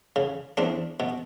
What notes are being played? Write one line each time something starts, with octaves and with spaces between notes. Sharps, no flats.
C#3
E2 C4 D4
B2